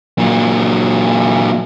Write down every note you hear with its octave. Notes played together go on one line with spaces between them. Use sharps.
A#2 F#3